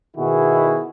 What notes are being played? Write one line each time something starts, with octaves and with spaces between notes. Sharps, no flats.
B2 D#3 E4 F#4 G#4